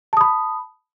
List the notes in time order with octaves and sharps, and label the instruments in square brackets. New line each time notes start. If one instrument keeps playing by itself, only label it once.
[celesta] A5
D#6
B5